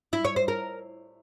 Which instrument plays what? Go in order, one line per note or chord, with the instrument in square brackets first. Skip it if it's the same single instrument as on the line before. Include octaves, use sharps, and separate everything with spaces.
[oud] E4
C#5
C5
A#4